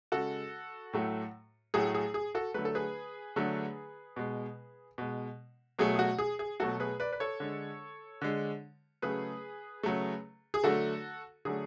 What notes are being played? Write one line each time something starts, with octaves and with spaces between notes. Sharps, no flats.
C#3 G#3 F#4 A4
A2 F#3 A3
A2 F#3 A3 G#4
G#4
G#4
F#4 A4
D3 F#3 A3 B4
A4
G#4 B4
D3 F#3 A3
B2 G#3
B2 G#3
B2 F#3 A3 G#4
G#4
F#4
G#4
G#4
B2 F#3 A3 F#4 A4
G#4 B4
B4 D5
B4
A4 C#5
D3 G#3
D3 G#3
C#3 F#3 A3 G#4 B4
C#3 F#3 A3
G#4
D3 F#3 A3 F#4 A4
D3 F#3 A3 G#4